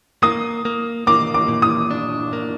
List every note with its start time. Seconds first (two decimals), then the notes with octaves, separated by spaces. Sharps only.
0.23 A#3 D#6
0.65 A#3
1.07 A#3 D6
1.34 D6
1.48 A#2
1.62 D#6
1.91 D4
2.33 A#3